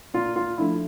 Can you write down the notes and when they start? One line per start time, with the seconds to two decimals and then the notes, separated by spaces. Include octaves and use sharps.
0.14 A#2 F4
0.36 F4
0.58 F3 A3 D4 E4